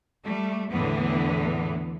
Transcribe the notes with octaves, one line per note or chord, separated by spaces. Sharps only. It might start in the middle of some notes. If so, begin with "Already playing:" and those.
G3 A3
E2 A2 D3 E3 B3